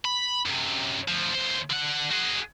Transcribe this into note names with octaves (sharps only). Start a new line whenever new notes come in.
B5
F#2 C3
D2 F3
D#2 C5
D3 F#5
F#4 G#4